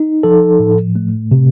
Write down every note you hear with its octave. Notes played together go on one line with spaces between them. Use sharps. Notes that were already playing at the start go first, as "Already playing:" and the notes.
Already playing: D#4
F3 A4
A2
A3
C3